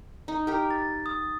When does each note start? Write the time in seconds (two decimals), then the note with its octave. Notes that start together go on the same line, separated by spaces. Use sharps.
0.28 D#4
0.47 G4 A#4
0.71 A6
1.06 D#6